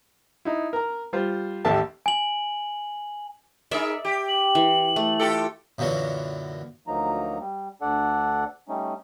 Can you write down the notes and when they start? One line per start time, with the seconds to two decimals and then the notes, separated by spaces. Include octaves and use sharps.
0.45 D#4 E4
0.73 A#4 A#5
1.13 G3 F4 C5
1.65 A1 D#2 G4 A4 E5 A5
2.06 G#5 F#7
3.71 D#4 G#4 A#4 D5 E5
4.05 G4
4.29 F#7
4.55 E3
4.96 A3
5.20 F4 G4 A4
5.78 F#2 A#2 D3 E3 F#3
6.87 D2 F3 F#3 A#3 D#4 A#5
7.39 G3
7.82 D2 D4 A4 D5 F#5
8.69 G3 A3 C#4 D#4